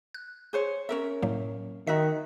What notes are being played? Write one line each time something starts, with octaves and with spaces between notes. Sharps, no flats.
F#6
G#4 C5 C#5
C#4 A#4 E5
A2 F#3 A#3
D#3 D#4 F#4 E5 B6